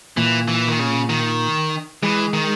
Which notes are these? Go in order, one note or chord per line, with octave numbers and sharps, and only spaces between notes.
A#2 E3
E3
D#3
C#3
D#3
E3 G#3
D#3